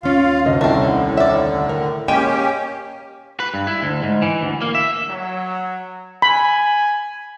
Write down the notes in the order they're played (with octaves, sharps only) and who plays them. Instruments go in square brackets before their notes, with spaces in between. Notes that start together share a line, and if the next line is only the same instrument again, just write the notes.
[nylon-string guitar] D#2 C#4 [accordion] F4 F5
[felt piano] D2 D#5
[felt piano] C2 [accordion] A2 D3 [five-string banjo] A3 C4
[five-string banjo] D5 E5
[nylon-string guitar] A#4
[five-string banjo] G#3 [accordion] A#3 C#4 G4 [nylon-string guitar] G5 [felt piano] D#7
[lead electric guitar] B4
G2
E4
D2
G#2
E3
D2
A#3
E5
[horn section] F#3
[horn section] G#5 [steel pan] B5